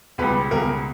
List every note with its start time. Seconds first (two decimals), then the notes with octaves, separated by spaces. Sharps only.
0.18 C#2 B2 G3 B4
0.51 C#2 B2 G3 A#4